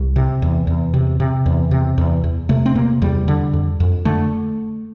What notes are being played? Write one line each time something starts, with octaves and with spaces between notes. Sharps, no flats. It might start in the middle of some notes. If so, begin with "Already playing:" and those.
Already playing: C2
C3
E2
E2
C3
C3
E2
C3
E2
E2
C3 A3
C4
C3 A#3
E2 G3
D3
F2
F2
D3 A3